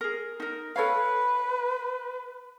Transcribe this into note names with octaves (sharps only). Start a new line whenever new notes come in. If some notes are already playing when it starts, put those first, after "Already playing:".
G#4 A#4
D#4 A#4
A4 B4 C#5 F5